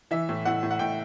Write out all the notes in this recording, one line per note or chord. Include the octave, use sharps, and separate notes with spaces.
E3 E5
A2
A2 F#5
A2
F#5
A2 G5